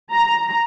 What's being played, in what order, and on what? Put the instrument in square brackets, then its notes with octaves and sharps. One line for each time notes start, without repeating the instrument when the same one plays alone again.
[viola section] A#5